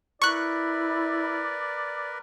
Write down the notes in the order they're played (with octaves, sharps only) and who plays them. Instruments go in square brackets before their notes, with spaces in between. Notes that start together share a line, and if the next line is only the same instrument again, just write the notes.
[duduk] E4 [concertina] A#4 B4 [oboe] D5 [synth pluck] C#6 F#6